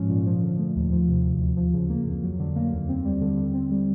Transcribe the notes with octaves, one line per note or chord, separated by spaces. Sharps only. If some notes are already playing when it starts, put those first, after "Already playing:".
Already playing: G#2 F3 G#3 C#4
A#2
F3
D3
A3
D#2
F3
C3
D2
D2
F3
C#3
A#3
F2
F#3
D3
A#3
D#2
C4
G3
D3
D3
C4
G3